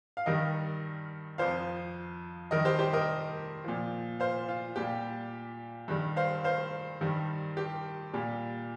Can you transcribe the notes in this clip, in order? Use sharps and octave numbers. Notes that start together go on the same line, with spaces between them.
F5
G2 D#3 G3 A#4 D#5
F2 F3 C5 F5
G2 D#3 G3 A#4 D#5
G4 C5
G4 C5
A#4 D#5
A#2 F3
C5 F5
F4
A#2 G3 G4
G2 D#3 G3
C5 F5
C5 F5
G2 D#3 G3
G4
A#2 G3